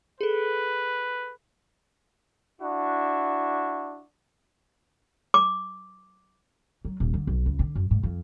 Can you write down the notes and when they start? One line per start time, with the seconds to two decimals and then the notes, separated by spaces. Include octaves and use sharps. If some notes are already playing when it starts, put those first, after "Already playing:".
0.21 G#4 A4 B4
2.61 D4 E4 F#4
5.34 D6
6.85 F#3
7.00 D#1
7.14 D3
7.27 B1
7.46 C#2
7.59 D3
7.76 F#2
7.91 G#2
8.03 F2